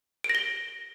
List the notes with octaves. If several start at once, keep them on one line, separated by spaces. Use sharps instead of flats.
D7
A#6
G7